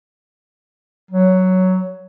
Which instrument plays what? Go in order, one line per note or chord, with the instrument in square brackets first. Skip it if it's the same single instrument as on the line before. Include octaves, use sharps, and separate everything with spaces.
[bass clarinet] F#3